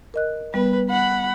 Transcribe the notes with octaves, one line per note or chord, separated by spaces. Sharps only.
A#4 D#5 F#6
G3 B3 B4
F#5 B5